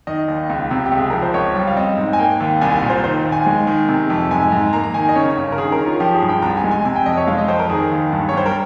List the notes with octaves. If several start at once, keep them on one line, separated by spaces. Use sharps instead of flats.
D#3 D#5
D#2
C#2
C3
G4
C#2
G#4
F3 A#4
C5
C#2 C#5
G3
F5
C4 D#5
G#2
G#5
A#3 G5
D#2
C2 G#5
G#5
A#2
C5
D#3 C5
D#2
G#5
G#3
D#3
C3
F2
G#2 G#5
G#2
A#3 A#5
A#5
D#3 G#5
D#5
C#3 C#5
G1
A#4
D#3 G#4
A#4
C#4
F4
F3 G4
G#4
G2
G5
C2 A#5
G#5
G#3
G#5
C3 G#5
G5
F2 D#5
C#5
G#3 F5
D#5
F2 C5
A#4
D#3 G#4
D#2
G2
C#5
G3 C5
A#4